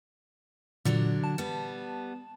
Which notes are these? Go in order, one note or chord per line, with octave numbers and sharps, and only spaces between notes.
A#2 D3 F#3 D4
A5
G3 B3